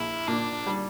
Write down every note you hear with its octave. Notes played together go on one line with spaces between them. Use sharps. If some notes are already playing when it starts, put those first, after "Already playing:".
Already playing: A#1 E4
A#2 D4
G3